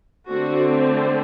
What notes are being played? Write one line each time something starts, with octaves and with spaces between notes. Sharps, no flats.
D3 A3 C4 F#4